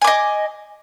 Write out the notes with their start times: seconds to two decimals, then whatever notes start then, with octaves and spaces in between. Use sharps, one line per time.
0.01 G#5
0.04 D6
0.07 D#5